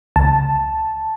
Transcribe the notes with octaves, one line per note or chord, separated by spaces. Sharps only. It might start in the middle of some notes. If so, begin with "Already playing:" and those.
C#2 A5